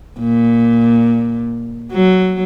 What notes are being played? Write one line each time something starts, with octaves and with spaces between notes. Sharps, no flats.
A#2
F#3